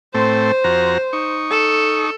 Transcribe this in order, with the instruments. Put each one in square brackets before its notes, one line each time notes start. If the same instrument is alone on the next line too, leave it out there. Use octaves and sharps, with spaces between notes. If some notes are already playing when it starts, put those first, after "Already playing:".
[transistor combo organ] A2 A3 C4 [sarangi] C5
[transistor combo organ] F2 F#4 A#5
D#4 C#6
[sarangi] A4